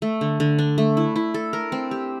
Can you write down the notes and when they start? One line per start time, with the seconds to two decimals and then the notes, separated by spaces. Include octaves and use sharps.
0.02 A3
0.21 D3
0.40 D3
0.59 D4
0.78 A3
0.97 E4
1.16 E4
1.34 A4
1.53 A#4
1.72 C4
1.91 G4